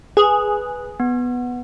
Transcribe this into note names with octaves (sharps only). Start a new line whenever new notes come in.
G#4 B4
B3